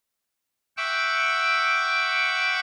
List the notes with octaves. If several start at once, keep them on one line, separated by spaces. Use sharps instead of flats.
E5 F#5 G5 C#6 D6 E6